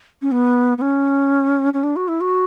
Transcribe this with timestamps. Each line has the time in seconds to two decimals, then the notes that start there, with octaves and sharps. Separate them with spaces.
0.22 C#4
0.31 B3
0.78 B3
0.81 C#4
1.73 C#4
1.83 D4
1.96 F#4
2.08 E4
2.21 F#4